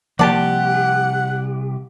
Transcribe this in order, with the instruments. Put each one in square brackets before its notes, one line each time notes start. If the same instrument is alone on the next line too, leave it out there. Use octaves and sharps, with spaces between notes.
[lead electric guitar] C2 G4 [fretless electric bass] F3 A#3 [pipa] D5 A5 [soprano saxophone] F#5